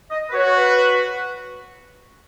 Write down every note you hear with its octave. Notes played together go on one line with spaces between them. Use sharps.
D#5
B4
F#4 C#5
B4